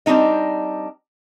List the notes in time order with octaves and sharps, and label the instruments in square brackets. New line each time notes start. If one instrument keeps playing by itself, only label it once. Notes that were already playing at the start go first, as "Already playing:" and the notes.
[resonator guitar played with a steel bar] G3 C4 D4 D#4 D#5